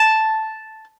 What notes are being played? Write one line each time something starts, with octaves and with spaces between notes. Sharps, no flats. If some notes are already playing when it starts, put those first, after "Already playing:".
Already playing: A5